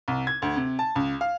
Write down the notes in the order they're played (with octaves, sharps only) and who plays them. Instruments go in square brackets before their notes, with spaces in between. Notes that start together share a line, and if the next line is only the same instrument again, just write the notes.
[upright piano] C2
G#6
D2
C3
A5
C#2
F5